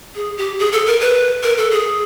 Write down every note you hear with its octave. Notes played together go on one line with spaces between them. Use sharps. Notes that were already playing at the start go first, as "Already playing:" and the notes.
G#4
G4
G#4
A4
A#4
B4
A#4
A4
G#4